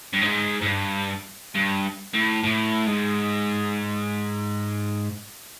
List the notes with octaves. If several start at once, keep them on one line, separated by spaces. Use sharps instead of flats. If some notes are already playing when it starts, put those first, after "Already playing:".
G2
G#2
G#2
G2
G2
A2
A2
G#2